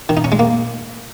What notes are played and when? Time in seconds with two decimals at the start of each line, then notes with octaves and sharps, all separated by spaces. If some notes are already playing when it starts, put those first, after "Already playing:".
0.09 D#3
0.17 D#4
0.24 C#4
0.32 G#3
0.39 A#3